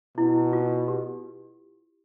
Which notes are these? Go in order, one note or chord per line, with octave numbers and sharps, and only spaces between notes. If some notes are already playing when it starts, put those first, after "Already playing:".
B2 E4
F4
G4